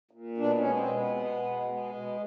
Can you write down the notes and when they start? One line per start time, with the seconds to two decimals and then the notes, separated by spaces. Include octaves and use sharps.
0.11 A#2
0.37 B2 D4
0.57 C#4
0.64 G#3
0.76 C4
0.90 B2
0.96 B3
1.16 G#3
1.42 B2
1.68 G#3
1.95 B2